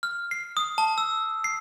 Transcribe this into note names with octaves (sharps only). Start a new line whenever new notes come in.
F6
C7
D#6
A5
E6
C7